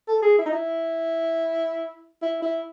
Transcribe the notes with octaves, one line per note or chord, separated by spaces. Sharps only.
A4
G#4
E4
D#4
E4
E4
E4